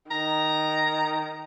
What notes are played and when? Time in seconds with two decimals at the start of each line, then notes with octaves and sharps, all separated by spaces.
0.11 D#3 A#5